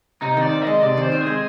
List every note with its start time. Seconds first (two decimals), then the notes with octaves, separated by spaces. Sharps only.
0.22 C3 D#4
0.37 D#3 D5
0.52 C4
0.62 G#3 D#5
0.82 C3 D5
0.97 D#3 C5
1.12 C4
1.21 G#4
1.27 G#3